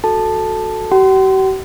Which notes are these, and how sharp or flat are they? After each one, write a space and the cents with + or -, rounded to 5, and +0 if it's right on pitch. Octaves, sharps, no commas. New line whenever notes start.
F#4 +0 A4 +0 A5 +0
G4 -45 F#5 +45 C6 -25